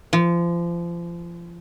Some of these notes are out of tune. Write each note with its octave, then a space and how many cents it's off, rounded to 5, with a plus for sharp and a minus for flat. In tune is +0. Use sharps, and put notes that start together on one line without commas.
F3 -30